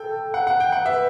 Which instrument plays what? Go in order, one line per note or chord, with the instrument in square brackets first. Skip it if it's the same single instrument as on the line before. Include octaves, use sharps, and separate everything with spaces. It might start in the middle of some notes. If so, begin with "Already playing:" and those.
Already playing: [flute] A4 [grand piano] G5
[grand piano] F#5
F#5
G5
F#5
[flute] B4 [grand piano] E5